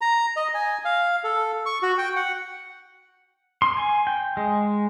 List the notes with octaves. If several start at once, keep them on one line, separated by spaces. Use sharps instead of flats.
A#5
D#5
G#5
F5
A4
C#6
F#4
G5
F#5
C6
G#5
G5
G#3